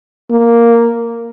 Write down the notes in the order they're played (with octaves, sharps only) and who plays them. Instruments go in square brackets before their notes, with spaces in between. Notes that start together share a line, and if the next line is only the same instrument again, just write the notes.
[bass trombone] A#3